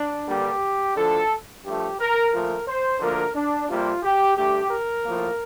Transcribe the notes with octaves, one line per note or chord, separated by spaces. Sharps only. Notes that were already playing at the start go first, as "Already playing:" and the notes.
Already playing: D4
G2 D3 G3 A#3 G4
D2 D3 F3 A4
G2 F3 A3 G4
A#4
A#2 F3 A3 A#4
C5
D2 D3 F3 A#3 A#4
D4
F2 C3 G3 A#3 F4
G4
G2 D3 A3 G4
A#4
A2 F3 A#3